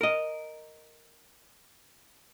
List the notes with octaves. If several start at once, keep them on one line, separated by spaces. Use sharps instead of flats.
A#4 D#5